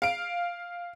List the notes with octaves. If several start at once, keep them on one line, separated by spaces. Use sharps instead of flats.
F5 D7